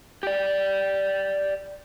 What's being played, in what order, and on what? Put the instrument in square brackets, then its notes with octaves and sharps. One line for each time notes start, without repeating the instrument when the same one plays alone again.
[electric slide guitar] G4 D5